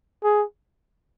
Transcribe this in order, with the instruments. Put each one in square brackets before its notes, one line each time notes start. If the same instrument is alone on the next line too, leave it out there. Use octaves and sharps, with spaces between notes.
[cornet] G#4